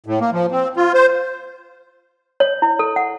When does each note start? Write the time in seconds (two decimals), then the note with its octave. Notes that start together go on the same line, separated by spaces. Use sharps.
0.06 A2
0.21 A#3
0.33 F3
0.52 C4
0.76 F4
0.94 C5
2.40 C#5
2.62 E4
2.79 A4
2.96 F#5